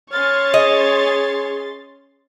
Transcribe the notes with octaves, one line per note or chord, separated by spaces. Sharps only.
C#4 C#5 C6 F6 A6
G#4 D#5